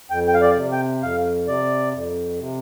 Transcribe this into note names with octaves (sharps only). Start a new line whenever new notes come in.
F2 G5
G5
F5
D5
C3
G5
F2 F5
C3 D5
F2
C3